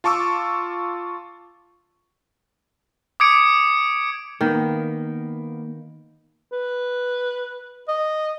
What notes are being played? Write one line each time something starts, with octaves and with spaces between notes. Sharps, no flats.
F4 A5 C#6 D6 E6
D6 D#6 G#6 C#7 D7
D#3 A#3 B3
B4
D#5